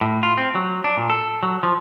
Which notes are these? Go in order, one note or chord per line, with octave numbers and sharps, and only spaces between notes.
A2
F4
C4
F#3
D4
A#2
A4
F#3
F3